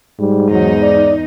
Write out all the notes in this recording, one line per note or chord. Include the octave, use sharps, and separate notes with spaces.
G#2 G3
E2 F#3 D#4
D5